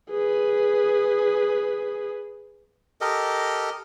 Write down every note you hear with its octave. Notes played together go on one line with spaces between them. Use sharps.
G#4 B4
G4 A4 A#4 D#5